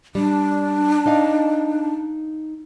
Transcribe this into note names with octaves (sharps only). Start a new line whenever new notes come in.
G3 D4
D#4 D#5 F5